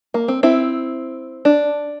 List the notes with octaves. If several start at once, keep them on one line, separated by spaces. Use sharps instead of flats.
A#3
C4
C4 E4
D4